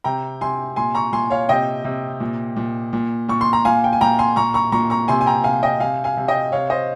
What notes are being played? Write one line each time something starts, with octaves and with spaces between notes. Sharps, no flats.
C3 G5 A#5
C3 G#5 C6
A#2 G#5 C6
A#5 C#6
A#2 G#5 C6
C#5 F5
C3 D#5 G5
C3
A#2
A#2
A#2
A#2 C#6
C6
A#5
A#2 F5 G#5
G5
G#5
A#2 G5 A#5
G#5 C6
A#2 A#5 C#6
A#5 C#6
A#2 A#5 C#6
A#5 C#6
C3 G#5 C6
G#5
G5 A#5
C3 F5 G#5
D#5 G5
C3 F5 G#5
F5 G#5
C3
D#5 G5
C3 C#5 F5
C5 D#5